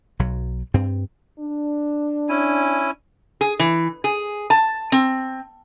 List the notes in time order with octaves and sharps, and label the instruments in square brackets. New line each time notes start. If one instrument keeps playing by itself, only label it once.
[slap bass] B1 F#3
G2 C4
[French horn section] D4
[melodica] C#4 E4 G#5
[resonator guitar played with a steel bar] G#4
E3
G#4
A5
C4